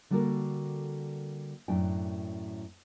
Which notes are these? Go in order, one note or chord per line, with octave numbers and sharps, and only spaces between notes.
D3 G3 A#3 F#4 A4 A#4
F#2 A2 D4 G5